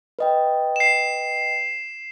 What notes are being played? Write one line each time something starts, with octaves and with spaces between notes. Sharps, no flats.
B4 D#5 G5
C7 E7